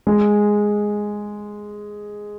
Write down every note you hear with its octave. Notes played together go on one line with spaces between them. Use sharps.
G#3